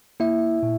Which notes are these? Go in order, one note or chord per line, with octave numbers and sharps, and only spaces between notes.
A#3 E4 E5
A#2